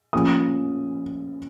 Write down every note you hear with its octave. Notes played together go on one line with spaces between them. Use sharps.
F3 A#3 C#4 D#6